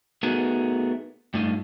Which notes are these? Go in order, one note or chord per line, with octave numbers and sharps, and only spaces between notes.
A3 B3 D#4 F#4 G#4 A#4
G2 A3 D#4 F4